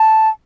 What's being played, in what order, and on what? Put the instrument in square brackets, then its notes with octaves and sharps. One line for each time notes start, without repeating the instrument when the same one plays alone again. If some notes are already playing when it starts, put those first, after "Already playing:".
Already playing: [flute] A5